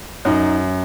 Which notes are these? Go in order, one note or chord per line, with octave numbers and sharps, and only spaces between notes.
F#2 D#4